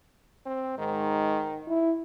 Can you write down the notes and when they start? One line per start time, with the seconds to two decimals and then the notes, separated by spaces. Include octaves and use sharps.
0.46 C4
0.78 G#2 D#3
1.68 E4